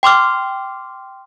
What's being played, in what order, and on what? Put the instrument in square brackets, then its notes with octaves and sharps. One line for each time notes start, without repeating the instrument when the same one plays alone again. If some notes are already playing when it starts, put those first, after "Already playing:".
[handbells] G5 C6 D6 F6